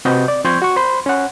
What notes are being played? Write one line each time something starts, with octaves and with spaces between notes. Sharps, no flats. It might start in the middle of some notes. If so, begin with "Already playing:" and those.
C3 C4 F#4 B4 D#5 G6
D5
F3 C4 C6 C#6 G6 G#6
F#4 C#6
C5 B5 C6
C#4 F#5